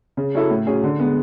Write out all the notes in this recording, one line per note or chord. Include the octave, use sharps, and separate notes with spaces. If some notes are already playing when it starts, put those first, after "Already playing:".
C#3
F#3 C#4 E4 A4
A2
F#3 C#4 G#4
D3
G#3 B3